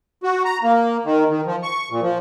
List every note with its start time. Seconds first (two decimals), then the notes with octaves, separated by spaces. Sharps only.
0.23 F#4
0.45 A#5
0.63 A#3
1.05 D#3
1.29 D#3
1.46 F3
1.63 C#6
1.90 A#2
2.02 F3